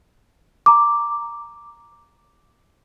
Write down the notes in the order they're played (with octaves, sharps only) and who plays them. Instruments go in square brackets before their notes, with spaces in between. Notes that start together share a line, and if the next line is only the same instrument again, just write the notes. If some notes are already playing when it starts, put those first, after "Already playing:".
[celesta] A#5 D6